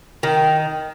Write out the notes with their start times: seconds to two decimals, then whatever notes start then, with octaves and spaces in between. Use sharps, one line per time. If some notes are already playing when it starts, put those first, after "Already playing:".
0.23 D#3